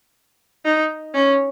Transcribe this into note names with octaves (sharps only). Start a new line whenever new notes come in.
D#4
C#4